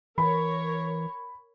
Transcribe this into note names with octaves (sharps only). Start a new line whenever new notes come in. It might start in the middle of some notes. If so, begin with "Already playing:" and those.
E3 A#4 C#5 B5